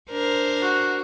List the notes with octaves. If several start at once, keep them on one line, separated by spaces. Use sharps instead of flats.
D4 A#4 C5
F#4